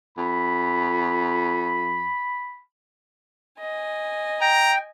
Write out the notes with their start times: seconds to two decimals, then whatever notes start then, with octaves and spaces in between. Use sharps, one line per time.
0.18 F2 B5
3.58 D#5 G#5
4.41 G5 A#5